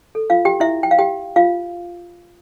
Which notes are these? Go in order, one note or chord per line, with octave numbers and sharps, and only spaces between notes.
A4
F4 F5
G4 G5
E4 E5
G5
F5
G4 G5
F4 F5